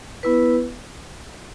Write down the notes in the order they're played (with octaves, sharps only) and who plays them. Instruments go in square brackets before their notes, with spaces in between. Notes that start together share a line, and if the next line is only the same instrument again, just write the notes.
[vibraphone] B3 E4 B4